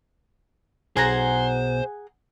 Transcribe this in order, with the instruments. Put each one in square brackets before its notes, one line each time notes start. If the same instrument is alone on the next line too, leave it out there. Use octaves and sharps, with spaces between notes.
[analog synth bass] B1 [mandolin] G#4 F#5 A#5 [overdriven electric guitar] C5